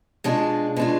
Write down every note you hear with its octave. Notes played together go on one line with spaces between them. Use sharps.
B2 G#3 D4 F4
B2 G#3 D4 F4